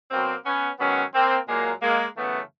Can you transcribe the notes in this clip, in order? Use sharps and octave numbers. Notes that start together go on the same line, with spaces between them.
B2 F#3 A#3 C4
B3 C#4
G#2 D#3 F#3 B3 C#4
A#3 C4
A#2 F#3 G#3 A#3
G#3 A#3
F#2 C#3 E3 A3 B3